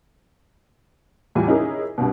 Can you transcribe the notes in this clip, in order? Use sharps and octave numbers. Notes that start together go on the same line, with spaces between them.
E2 A2 G3 F4 G#5
C#4 D#4 E4 G#4 A#4
C2 G2 B2